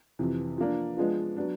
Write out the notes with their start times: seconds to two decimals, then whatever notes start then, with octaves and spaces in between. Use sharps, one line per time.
0.19 F2 C3 E3
0.58 F3 A#3 D4
0.97 F3 G#3 B3 D4 F4
1.37 F#3 B3 D4